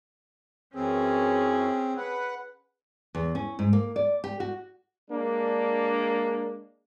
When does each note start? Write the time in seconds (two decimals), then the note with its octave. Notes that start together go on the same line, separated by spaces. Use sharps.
0.75 F#2 E3 C4 C#4 G#4
1.97 B4 F#5
3.15 E2
3.35 C#4
3.59 G#2
3.73 A#3
3.96 D5
4.24 G4
4.40 F#4
5.10 G#3 A#3 D4